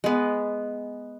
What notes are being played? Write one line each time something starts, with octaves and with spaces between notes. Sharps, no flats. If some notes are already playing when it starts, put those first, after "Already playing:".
G#3 B3